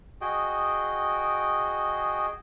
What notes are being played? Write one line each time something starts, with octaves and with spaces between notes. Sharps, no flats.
F#4 G#4 D#5 G5